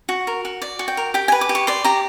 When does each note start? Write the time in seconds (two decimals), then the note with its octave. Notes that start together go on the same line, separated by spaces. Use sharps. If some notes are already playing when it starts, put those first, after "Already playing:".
0.09 F#4
0.27 A#4
0.45 F#4
0.62 D5
0.79 F#4
0.88 G5
0.97 A#4
1.14 G4 G5
1.28 B4 G#5
1.41 D6
1.49 G4
1.55 C#6
1.67 D5 C6
1.84 G4 A#5